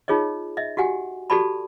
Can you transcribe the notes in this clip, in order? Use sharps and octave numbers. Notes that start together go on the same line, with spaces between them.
D#4 F4 G#4 C#5 D#5
D#5 E5
F#4 G4 F#5 G#5
F#4 G4 A4 D5 A5 B5